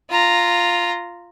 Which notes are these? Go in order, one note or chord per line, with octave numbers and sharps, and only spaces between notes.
F4 A#5